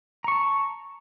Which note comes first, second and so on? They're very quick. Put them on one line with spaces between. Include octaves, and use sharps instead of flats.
A#5 C#6 A5